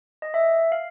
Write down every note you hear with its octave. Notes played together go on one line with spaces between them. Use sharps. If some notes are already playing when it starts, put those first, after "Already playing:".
D#5
E5
F5